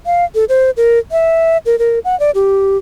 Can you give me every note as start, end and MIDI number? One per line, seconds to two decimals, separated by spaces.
0.06 0.25 77
0.35 0.45 69
0.49 0.71 72
0.77 0.99 70
1.12 1.58 76
1.66 1.78 70
1.79 1.99 70
2.05 2.18 78
2.20 2.31 74
2.35 2.77 67